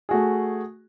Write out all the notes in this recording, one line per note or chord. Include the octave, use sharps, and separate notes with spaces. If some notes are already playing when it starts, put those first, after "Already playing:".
A3 F#4 G#4